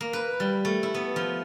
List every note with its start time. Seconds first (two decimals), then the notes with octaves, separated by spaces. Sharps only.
0.01 A#3
0.13 B4
0.40 G3
0.65 A3
0.83 E4
0.94 B3
1.16 F3